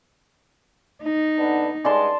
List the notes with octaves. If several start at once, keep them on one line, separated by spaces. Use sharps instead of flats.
D#4
D3 B3 D4
G2 G#3 D5 A5 C6